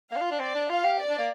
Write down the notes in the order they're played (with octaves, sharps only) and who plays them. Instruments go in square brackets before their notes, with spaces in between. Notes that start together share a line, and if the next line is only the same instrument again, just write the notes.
[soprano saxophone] A#3 [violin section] F5
[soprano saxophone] D4
F4
D4
[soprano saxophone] C4 [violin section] D5
[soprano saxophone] D4
[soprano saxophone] F4 [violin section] F5
[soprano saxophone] G4
[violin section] D5
[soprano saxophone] D4
A#3